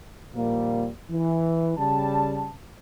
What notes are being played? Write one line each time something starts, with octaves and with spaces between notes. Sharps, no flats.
D#2 A#2 F3 G3 A#3
E3
C#3 G3 A5